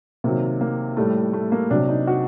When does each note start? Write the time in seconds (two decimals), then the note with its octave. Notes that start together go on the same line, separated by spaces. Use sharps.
0.24 C3 D#3 F#3 A#3
0.61 A#3
0.97 A2 G3 A3
1.33 A3
1.52 A#3
1.71 C3 F#3 D4
1.88 D#4
2.07 F#4